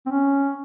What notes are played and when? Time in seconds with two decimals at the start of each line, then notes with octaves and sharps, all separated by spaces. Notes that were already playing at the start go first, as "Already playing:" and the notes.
0.06 C4
0.11 C#4